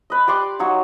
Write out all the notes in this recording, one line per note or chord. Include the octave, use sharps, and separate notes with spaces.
B4 D#5
G4 D5 C6 D6
F#3 D#4 C#5 F5